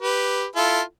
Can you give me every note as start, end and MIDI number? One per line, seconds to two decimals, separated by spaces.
0.01 0.46 67
0.01 0.46 71
0.56 0.81 64
0.56 0.81 65
0.56 0.81 69